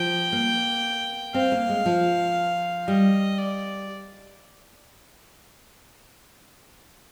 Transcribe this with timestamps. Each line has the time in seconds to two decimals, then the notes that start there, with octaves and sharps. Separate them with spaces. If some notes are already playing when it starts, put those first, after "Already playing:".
Already playing: F3 G5
0.33 A#3
1.34 C4 F5
1.52 A#3
1.69 G#3
1.86 F3
2.88 G3 D#5
3.38 D5